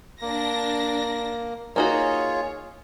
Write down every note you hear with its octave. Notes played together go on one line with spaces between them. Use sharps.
A#3 D4 A#6
A#3 D#4 F4 F#4 G#4 C#5